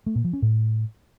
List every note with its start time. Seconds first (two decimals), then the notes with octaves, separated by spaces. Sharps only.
0.06 A3
0.15 A#2
0.24 F3
0.33 C#4
0.42 A2